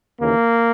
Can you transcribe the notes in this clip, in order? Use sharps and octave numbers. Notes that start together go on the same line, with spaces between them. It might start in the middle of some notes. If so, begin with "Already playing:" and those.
D#2 C#3 E3 A#3